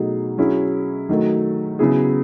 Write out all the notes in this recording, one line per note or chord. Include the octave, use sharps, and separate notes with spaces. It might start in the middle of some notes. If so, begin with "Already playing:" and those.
Already playing: B2 F#3 A3 D#4 G#4
F#3 C#4 E4 G#4
D#3 F#3 A3
C#3 F#3 B3 E4 G#4